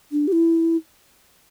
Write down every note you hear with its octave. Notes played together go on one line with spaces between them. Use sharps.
D4
G4
E4